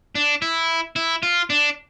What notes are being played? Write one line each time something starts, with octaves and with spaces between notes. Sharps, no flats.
D4
E4
E4
F4
D4